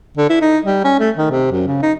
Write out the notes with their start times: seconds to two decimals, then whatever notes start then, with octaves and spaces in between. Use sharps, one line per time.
0.17 D3
0.30 E4
0.41 D#4
0.65 G3
0.84 C#4
0.99 A3
1.17 D#3
1.31 C3
1.51 F#2
1.67 C#3
1.82 D#4